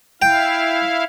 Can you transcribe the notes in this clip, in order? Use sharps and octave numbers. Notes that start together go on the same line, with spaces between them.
E4 F5 G5